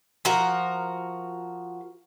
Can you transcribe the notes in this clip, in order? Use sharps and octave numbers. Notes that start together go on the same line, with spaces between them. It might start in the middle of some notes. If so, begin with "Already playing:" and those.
F3 F#4 A#4